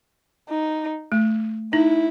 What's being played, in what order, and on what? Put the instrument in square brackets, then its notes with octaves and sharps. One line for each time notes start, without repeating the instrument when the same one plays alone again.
[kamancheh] D#4
[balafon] A3
[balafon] D#4 [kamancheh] E4